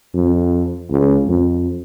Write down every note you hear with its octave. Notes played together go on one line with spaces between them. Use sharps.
F2
C#2
F2